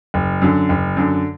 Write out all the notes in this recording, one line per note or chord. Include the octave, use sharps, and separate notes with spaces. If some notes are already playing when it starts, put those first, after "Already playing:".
F#1
F#2 D3
F#1
F#2 D3